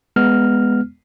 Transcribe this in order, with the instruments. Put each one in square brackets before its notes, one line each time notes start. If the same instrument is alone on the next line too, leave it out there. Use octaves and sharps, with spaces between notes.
[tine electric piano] G#3 B3 F6